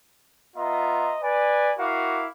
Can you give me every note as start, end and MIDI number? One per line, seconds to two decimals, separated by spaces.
0.56 1.16 59
0.56 1.16 65
0.56 1.16 75
0.56 1.16 76
0.56 1.16 82
0.56 1.16 84
1.22 1.73 71
1.22 1.73 74
1.22 1.73 80
1.78 2.26 64
1.78 2.26 66
1.78 2.26 70
1.78 2.26 77
1.78 2.26 86